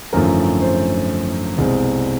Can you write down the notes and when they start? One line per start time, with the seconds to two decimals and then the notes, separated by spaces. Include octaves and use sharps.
0.13 G#1 F#2 D3 F3 A3 A#4
0.62 C5
1.58 C2 B2 G#3 C4